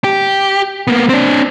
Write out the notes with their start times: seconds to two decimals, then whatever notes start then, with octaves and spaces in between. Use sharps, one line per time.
0.04 G4
0.87 A#3 B3
1.09 C4 D4